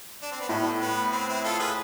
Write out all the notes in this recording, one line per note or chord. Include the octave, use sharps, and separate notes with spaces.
D4
C4
B3
A2 A3
B3
C4
C4 E4
F4 A4
G#4 B4